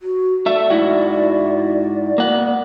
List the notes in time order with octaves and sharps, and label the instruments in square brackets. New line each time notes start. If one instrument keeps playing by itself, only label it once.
[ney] F#4
[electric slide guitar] A3 E5 [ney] D5
[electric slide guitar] G#2 E4 F#4
A#3 F#5